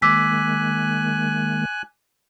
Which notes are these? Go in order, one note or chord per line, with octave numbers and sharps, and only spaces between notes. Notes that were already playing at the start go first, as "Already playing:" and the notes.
D#3 G#3 A#3 G#5 D6 E6 F#6 B6